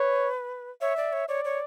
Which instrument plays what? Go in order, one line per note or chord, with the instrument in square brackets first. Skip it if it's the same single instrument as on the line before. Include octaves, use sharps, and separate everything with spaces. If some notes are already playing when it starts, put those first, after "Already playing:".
Already playing: [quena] B4 [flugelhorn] C#5
[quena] C#5 [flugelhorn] E5
[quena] D5
C#5
[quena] C#5 [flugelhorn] D5
[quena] C#5